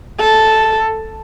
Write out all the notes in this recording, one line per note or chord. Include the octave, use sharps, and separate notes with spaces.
A4